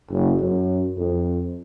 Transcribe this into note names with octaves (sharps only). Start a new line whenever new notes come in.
F#1
F#2
F2